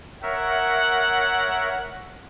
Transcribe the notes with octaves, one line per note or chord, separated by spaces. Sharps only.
A#4 C#5 E5 F#5